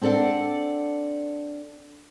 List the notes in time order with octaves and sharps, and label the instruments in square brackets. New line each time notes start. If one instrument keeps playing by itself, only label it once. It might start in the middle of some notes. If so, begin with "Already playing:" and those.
[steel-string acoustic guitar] C4 D4 A4 D5 F#5